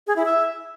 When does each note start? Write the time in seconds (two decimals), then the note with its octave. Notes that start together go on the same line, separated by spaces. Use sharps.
0.07 G#4
0.16 E4
0.25 E5